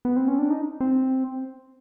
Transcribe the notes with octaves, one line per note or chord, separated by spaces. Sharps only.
B3
C4
C#4
D4
D#4
C4